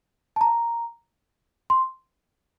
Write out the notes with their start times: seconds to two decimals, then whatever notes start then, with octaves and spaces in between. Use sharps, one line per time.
0.36 A5
0.41 A#5
1.70 C6